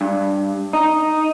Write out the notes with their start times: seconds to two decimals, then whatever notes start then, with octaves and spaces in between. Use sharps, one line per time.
0.01 G2
0.73 D#4